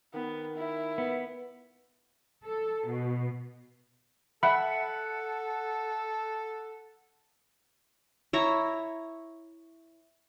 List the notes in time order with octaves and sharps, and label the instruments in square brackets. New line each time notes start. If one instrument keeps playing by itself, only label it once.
[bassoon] D#3 [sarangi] B3
[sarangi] E4
[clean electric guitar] B3
[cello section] A4
B2
[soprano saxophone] A4 [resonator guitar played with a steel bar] E5 [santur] F#5 [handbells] B5
[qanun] E4 C#5 A#5